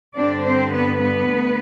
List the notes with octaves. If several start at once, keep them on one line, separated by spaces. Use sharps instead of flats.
G2 D3 G3 C4 D4 D5
C4 C5
B3 B4
B3 B4
D2